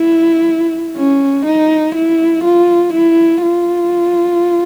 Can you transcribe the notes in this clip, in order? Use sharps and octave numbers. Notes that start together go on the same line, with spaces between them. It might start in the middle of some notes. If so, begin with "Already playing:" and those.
Already playing: E4
C#4
D#4
E4
F4
E4
F4